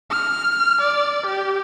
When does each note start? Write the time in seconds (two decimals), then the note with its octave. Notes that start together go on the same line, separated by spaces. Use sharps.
0.11 F6
0.81 D5
1.26 G4